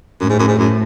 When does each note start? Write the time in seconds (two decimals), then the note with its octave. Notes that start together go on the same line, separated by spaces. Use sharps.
0.20 F#2 A2
0.30 G#2
0.39 F#2
0.48 G#2
0.58 F#2